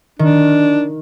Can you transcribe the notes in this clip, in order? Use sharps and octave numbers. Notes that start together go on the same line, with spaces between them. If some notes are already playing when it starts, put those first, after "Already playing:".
D#3 D4